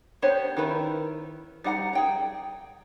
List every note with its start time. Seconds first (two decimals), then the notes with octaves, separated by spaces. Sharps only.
0.22 B3 D4 G4 C5 C#5
0.57 D#3 E4 A#4 B4 B5
1.64 G3 D#4 F#5 G#5 A#5
1.93 G#4 G5 A#5